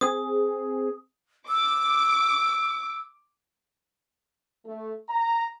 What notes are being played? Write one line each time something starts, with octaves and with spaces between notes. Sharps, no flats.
C4 G#4 D#6
D6 E6
A3
A#5